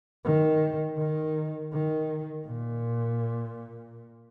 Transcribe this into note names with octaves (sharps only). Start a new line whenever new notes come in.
D#3
D#3
D#3
A#2